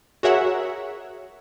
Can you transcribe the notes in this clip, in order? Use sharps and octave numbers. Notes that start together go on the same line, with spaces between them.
F#4 G#4 A#4 C#5 E5 F#5